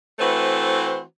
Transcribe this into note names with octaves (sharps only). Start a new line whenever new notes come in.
E3 A3 C4 F#4 B4 C5